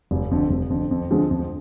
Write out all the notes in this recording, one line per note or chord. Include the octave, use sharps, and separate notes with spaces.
F1
F2 D3
F1
F2 D3
F2
D3 F3 G#3 C4
F2